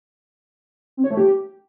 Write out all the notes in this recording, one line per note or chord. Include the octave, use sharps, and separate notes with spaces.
C4
C#5
A3
G4